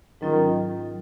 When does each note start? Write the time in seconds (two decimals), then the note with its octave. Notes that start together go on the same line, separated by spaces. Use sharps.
0.21 G#2 D#3 F#3 C#4 F4
0.85 F#3